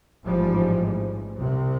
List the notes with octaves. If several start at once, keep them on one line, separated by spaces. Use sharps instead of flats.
A1 G#2 F3 G3
C2 C3